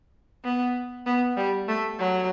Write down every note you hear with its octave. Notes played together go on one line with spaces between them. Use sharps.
B3
B3
G3
A3
F#3